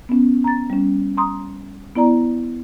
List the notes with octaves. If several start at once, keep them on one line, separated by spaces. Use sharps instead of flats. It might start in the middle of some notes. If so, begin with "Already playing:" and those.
B3 C#4
A#5 A6
G3 C#4
A#5 C6 D#6
B3 E4 D5 A#5